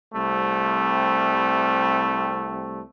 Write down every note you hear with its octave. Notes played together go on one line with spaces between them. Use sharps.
C2 G3 A3 C4